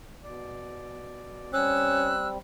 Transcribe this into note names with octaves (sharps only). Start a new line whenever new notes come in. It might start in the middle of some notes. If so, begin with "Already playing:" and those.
B2 D5
G3 C4 C#4 E6 F#6